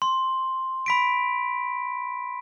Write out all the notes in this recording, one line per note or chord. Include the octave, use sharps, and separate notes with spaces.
C6
B5 B6 D7